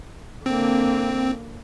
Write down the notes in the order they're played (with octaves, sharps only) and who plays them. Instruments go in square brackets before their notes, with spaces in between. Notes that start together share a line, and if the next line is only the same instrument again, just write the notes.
[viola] D3 A#3 [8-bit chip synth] C4